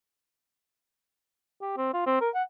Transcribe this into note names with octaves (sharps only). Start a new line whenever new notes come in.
G4
C4
F4
C4
A#4
F#5